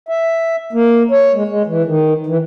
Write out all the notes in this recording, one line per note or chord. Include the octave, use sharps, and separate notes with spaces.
E5
A#3
C#5
G#3
G#3
E3
D#3
E3